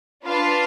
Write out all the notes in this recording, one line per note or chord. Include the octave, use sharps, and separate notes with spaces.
D4 F4 B4 F5 A5